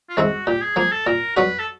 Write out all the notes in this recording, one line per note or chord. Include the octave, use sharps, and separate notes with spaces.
F4
D#3 G#3 C4 E4 F#4
A#2 G4
G#4
F3 A#3 G#4
A4
A#2 A#4
F#3 B3 D4 F#4 B4
A4